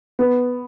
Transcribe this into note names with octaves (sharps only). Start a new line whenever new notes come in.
B3